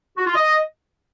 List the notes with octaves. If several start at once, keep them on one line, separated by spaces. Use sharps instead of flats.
F#4
F4
D#5